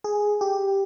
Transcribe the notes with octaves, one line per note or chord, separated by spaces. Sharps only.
G#4
G4